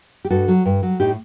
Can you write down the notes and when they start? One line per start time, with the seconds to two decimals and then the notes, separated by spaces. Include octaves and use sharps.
0.25 G4
0.30 G2 F#4 A4
0.48 F#3
0.65 G2
0.83 F#3
1.00 A2 D#4 G4